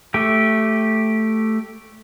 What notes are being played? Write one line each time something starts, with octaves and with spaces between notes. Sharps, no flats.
A3 G4